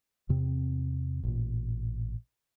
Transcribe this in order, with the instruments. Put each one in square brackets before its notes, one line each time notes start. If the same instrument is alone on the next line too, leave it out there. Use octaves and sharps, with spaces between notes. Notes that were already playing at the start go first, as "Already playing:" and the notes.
[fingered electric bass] E2 C3 C4
A1 A#2